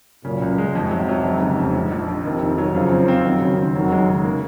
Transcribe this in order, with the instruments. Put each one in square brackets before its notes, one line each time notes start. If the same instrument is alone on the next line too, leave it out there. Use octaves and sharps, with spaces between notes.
[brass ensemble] F#2 A#2 [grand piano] C#3
[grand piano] C#2
G#3
[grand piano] F2 [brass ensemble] G#2 C3
[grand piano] F#3
F#3
F1
C#3
F2
A#1
A#1
F3
[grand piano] F1 [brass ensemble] C3 D#3
[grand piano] F1
F#3
[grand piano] F#2 [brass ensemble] C#3 F3
[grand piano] C4
C4
[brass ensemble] D#3 F#3 [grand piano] C4
[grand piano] C#3
C4
[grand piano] F1 [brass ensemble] D#3 F#3
[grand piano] G#3
C#3
A#3